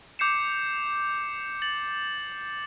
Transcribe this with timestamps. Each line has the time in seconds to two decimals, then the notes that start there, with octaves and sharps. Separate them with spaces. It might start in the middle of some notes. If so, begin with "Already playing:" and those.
0.19 D6 G6 C7 C#7 E7
1.62 A6 F#7